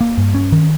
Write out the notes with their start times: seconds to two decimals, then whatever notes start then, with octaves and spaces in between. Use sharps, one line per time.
0.01 A#3
0.17 G2
0.35 C#4
0.52 D#3